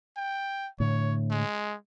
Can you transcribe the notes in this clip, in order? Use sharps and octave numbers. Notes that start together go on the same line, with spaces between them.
G5
A2 D3 C#5
G#3